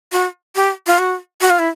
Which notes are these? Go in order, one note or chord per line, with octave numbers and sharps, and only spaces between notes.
F#4
G4
F4
F#4
F#4
F4
E4